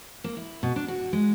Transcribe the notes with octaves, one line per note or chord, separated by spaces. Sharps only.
A#3
E4
B2
D4
F#4
G#3